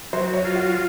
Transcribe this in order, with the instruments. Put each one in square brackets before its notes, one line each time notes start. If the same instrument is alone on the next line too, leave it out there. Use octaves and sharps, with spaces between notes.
[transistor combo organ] F#3 [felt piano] C5
[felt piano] C#5
[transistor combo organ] F4
[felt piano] F#4